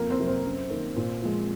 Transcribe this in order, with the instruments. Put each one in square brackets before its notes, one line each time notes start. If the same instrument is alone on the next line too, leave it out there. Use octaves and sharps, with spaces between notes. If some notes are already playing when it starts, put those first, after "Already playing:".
Already playing: [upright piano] F2 A#3 A#4
C4 C5
C3 F#3 A#3
C4 C5
F#2
D#3 A#3
A#2
F3 G#3